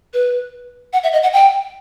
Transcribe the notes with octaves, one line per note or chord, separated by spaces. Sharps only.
B4
F#5
E5
D#5
F#5
G5